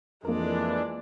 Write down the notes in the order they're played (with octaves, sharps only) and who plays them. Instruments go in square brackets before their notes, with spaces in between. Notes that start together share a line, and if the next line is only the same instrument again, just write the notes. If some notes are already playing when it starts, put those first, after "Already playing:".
[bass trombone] F2 [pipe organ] E3 D4 [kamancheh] G#3 D5 [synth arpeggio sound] A#3 A#4